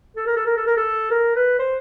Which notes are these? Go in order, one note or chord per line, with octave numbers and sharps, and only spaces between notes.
A4
A#4
A4
A#4
A4
A#4
A4
A#4
B4
C5